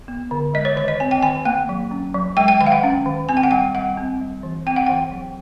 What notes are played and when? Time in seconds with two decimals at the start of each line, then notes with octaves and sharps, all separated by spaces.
0.08 B3
0.31 D3
0.54 G#3 D#5
0.65 C#5
0.76 D#3 C#5
0.88 D#5
1.00 C4 G#5
1.11 G5
1.23 D#3 G#5
1.45 A#3 G5
1.69 F#3
1.91 C#4
2.14 F#3
2.37 G#3 G5
2.48 G5
2.61 D#3 G5
2.67 F5
2.72 F#5
2.83 C#4
3.06 D#3
3.29 C4 G#5
3.37 G5
3.43 F#5
3.51 G3 G5
3.75 G3 F#5
3.97 C4
4.21 G3
4.43 E3
4.67 C4 G5
4.76 F#5
4.86 E3 G5
5.12 F#3